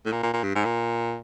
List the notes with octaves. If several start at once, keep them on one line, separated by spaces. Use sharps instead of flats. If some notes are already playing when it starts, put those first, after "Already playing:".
A2
A#2
A#2
A#2
G2
G#2
A#2